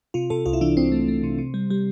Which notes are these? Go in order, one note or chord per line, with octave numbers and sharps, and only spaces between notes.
C3 F4
C3 A4
C2 F4
E4
E3 D4
C2 C4
A3
A3
C3
C3
G3
G3